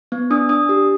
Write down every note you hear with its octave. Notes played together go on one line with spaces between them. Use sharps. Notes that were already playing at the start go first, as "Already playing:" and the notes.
B3
D4 D#6
D4 D#6
G4